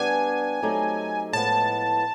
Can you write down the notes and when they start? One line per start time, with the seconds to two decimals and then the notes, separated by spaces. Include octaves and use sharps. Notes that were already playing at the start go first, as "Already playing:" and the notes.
Already playing: G3 B3 D4 G4 G#5
0.62 F#3 A3 C4 D#4 G4
1.33 A2 F3 G#3 B3 A5